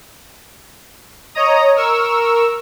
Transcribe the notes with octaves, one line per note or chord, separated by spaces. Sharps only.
C#5 D#5 A#5 D#6
A#4 C#6 E6